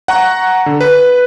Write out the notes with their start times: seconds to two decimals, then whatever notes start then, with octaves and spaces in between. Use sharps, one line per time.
0.08 F#5 A#5 C#6
0.66 D3
0.81 B4